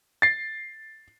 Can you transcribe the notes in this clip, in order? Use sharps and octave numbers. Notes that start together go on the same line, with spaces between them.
A6 C7